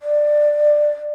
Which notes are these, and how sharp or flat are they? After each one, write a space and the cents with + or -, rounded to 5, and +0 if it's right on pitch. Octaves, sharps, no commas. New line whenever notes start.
D5 +15